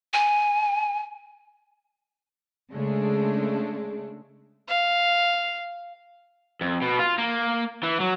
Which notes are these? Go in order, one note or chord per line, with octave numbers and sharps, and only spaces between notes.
G#5
C#3 G#3 A3 D4
F5
F2
B2
F4
A#3
E3
F#3